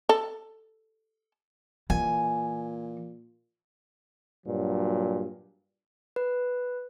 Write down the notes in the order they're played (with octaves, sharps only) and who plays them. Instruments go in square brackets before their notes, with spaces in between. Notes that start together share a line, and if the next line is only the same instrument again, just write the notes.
[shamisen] A4
[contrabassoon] A#2 [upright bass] E3 [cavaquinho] G#5
[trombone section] G2 A#2 F#3
[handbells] B4